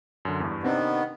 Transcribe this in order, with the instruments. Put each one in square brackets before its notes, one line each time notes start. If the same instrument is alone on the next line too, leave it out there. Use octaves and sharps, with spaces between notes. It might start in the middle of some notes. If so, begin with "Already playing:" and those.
[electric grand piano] F#2 D3
E2 G2
[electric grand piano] C3 C4 D4 [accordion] D#3 B3